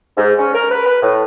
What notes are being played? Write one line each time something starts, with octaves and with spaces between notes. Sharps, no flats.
G#2
C#4
A#4
B4
B4
A2